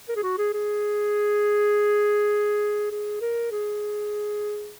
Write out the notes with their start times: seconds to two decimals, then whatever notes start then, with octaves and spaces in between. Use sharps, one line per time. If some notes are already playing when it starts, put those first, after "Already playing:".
0.09 A#4
0.16 G#4
0.23 F#4
0.38 G#4
0.53 G#4
2.92 G#4
3.21 A#4
3.51 G#4